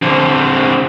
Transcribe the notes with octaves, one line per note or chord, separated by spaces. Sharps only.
D3 C4